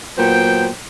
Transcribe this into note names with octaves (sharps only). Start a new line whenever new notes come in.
A#2 F#3 B3 C5 G5